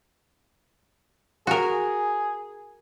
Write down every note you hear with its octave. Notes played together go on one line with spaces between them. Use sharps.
F#4 G#4 A#4